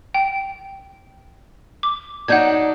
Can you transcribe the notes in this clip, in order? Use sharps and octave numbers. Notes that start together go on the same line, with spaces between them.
G5
D6
F#3 D4 D#4 F#5 G6 G#6